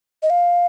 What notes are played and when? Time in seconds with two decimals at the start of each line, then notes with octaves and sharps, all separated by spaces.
0.23 D#5
0.30 F5